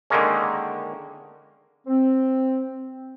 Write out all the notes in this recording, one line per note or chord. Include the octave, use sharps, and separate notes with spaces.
D3 D#3 G#3 A#3 C#4
C4